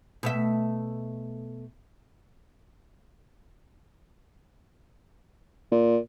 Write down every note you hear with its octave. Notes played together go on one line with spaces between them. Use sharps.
B2 A3 E5
A#2